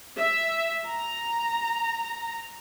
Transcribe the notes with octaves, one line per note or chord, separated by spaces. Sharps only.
E5
A#5